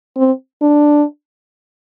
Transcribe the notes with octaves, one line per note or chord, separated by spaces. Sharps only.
C4
D4